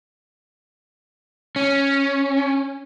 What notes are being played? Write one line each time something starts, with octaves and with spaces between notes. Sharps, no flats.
C#4